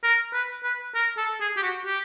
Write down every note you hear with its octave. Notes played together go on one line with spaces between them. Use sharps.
A#4
B4
B4
A#4
A4
G#4
G4
F#4
G4